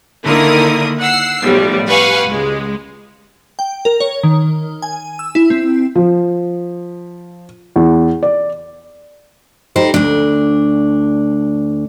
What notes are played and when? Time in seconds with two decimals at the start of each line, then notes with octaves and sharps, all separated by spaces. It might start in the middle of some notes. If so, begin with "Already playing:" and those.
0.25 D3 D#3 A#3 E4 A#4 D#6
1.00 F#5 E6 C7
1.42 B1 A2 F3 G3
1.88 G4 B4 F5 F#5 G#5 C#6
2.28 C#2 G#3
3.59 G5
3.85 A#4
4.00 C#5
4.23 D#3
4.82 G#5
5.19 E6
5.35 E4
5.50 C4
5.95 F3
7.76 E2
8.23 D5
9.76 G3 D#4 C5
9.94 D2 D4